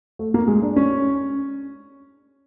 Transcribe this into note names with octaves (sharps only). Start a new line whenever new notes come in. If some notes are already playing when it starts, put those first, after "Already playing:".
A3
A#3
G#3
D4
C#4